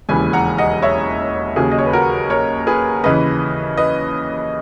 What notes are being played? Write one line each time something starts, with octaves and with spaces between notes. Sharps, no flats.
E1 D#2 C#3 E3 G#5 B5
F#5 A#5
D#5 F#5
C#5 E5
D#2 C#3 F#3 G#4
D#5
C#5
B4
F#4 A#4
A#4 C#5
G#4 B4
D#2 C#3 E3 B4 D#5
B4 D#5